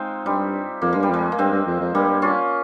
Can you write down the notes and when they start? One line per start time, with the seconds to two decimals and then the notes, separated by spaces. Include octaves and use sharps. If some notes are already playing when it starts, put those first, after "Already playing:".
Already playing: G#3 C4 D#4 F4
0.26 G2 G3
0.82 F2 A#3
0.93 G2 G#3
1.03 G3
1.09 F2 G#3
1.32 A#3
1.38 G2 G#3 C4
1.52 G2
1.66 F2
1.80 F2
1.94 G2 G3 A#3
2.22 C#4 F4